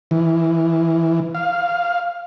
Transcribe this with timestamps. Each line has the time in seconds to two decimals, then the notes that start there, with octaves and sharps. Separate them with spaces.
0.11 E3
1.35 F5